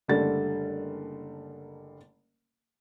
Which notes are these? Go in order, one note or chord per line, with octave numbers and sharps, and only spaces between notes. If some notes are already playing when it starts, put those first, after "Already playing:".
F#1 D3 G3 A3 A6